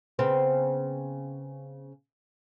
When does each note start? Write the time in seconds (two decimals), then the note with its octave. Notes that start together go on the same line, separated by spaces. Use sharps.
0.19 C#3 B3 C4